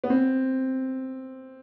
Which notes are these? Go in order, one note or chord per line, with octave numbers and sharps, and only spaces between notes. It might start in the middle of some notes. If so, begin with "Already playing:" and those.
B3
C4